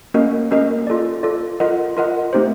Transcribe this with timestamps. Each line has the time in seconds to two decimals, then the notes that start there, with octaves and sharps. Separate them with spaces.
0.14 A#3 C#4 F#4 A#4 D#5
0.51 A#3 C#4 F#4 A#4 D#5
0.87 F4 A4 D5
1.23 F4 A4 D5
1.60 F4 A#4 D#5 F#5
1.97 F4 A#4 D#5 F#5
2.33 A3 C4 D#4 G4 C5